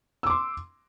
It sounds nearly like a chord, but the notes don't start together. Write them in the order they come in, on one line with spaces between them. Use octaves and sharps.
E6 D6 C6